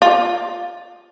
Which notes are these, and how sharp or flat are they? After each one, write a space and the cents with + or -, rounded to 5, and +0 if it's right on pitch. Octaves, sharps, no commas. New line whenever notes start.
F4 +10